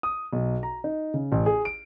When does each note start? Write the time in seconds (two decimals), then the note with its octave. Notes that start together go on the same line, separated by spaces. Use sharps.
0.03 D#6
0.33 B1
0.63 A#5
0.84 D#4
1.14 C#3
1.32 A1
1.46 G#4
1.65 D7